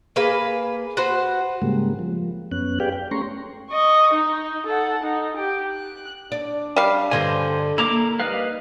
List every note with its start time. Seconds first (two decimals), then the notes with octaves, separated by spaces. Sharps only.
0.16 A#3 G#4 B4 F5
0.97 F#4 B4 C5
1.62 G#2 C#3 G3 G#3 A#3
1.99 F3
2.52 F#2 B3 C#4 F#6
2.80 G4 G#4 B4 D5 F5 G5
2.92 G5
3.11 A3 C#4 A#5 C6 C#6
3.70 D#5 C#6
4.13 D#4
4.66 A4 F#5
5.04 D#4
5.37 G4
5.73 F#6
6.32 D4 D5
6.76 G3 F5
7.11 G2 D3 C5 D#5 G#5
7.78 A#3 E4 A#5 D6
8.20 G3 D#4 B4 F5